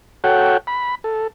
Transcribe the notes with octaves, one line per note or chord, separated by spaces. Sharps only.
F#4 A4 C#5 F#5 G5
B5
A4